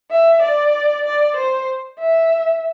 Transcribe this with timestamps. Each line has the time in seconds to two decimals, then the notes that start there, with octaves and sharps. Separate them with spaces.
0.11 E5
0.42 D5
1.05 D5
1.36 C5
1.99 E5